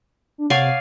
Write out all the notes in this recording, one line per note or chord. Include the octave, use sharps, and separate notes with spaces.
D4
C3 C#5 D5 F5 F#5 G#5 C#6